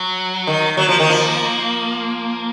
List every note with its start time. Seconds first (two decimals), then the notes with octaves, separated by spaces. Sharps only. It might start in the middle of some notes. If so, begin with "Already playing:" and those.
Already playing: F#3
0.47 D#3
0.77 F#3 A#3
0.89 F3
1.00 D#3
1.10 F3